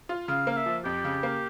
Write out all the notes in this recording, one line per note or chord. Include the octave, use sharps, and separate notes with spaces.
F4
C#3 F5
A#3 F5
E5
F3
F2 G4
C#3
A#3